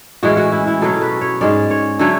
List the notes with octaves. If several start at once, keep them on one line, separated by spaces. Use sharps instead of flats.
A2 E3 G#3 C#4 F#4
F#4
E4
E4
B2 F#3 C#4 A4
B4
C#5
G#2 G#3 C#4 D5
C#5
D3 F#3 A3 C#5